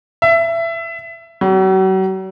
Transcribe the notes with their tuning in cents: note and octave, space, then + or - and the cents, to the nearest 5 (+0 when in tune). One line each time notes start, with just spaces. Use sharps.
E5 +20
F#3 +40